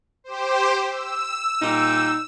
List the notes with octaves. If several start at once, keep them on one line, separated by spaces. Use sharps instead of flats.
G4 C5
E6
A#2 G3 D#4